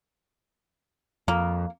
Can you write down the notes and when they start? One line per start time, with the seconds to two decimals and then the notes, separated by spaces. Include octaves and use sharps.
1.28 F2 A#3